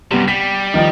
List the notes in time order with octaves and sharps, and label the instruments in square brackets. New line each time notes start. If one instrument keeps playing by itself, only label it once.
[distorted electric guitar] F#2 C3 [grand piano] G3 B3
[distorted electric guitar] G3 [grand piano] B6
[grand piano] D#3 F3 D#4